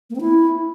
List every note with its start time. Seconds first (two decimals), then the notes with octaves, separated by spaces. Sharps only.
0.10 A#3
0.15 C4
0.21 E4